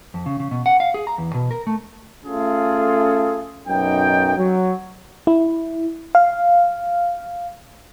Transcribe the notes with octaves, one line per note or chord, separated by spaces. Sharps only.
F2
C#3
C#3
B2
F#5
F5
G#4
A#5
E2
B2
A#4
A3
A3 C#4 F4 G#4 A4
B1 F#2 D#4 G5
F#3
E4
F5